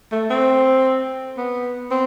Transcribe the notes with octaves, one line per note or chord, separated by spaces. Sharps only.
A3
C4
B3
C4